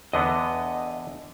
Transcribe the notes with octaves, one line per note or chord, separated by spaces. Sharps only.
E2 D3 B3 D#5